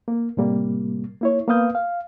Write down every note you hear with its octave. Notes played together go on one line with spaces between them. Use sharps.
A#3
A2 C3 G3 A#3
A#3 E4 C#5
A#3 B3 B4 F5 D#6 G6
F5